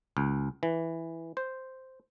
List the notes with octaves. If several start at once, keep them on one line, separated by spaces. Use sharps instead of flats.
C#2
E3
C5